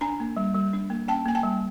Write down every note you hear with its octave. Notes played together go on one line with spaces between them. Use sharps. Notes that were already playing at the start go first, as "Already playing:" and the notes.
D4 G#5 A#5
A#3
G3
G3
D4
A#3
C#4 G5 A5
A#3 G#5
G5 A5
G3